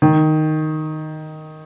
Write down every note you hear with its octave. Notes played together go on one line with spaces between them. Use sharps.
D#3